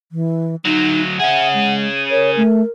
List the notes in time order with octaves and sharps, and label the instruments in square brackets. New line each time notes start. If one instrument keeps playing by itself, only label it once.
[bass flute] E3
[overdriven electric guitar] D2 F#3 [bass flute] D#4
[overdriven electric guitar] C#4 G#4 [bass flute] E5 [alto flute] F#5
[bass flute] G#3
[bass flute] A#4 [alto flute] C#5
[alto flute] A3